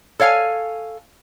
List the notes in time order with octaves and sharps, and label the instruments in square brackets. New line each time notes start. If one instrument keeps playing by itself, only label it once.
[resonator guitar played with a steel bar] A4 C#5 F5 G5 G#5